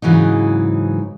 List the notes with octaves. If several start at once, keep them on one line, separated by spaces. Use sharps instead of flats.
G#2 C#3 E3 F#3 D#4